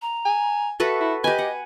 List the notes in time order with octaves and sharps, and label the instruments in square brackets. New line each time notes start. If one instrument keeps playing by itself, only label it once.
[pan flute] A#5
[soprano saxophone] G#5
[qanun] F#4 A4 B4 [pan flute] E5
[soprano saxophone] E4
[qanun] G4 G#5 [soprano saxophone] B4 [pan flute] D#5
[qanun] F#5